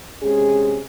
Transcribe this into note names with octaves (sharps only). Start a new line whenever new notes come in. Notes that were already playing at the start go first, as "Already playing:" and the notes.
C3 G#3 C#4 G#4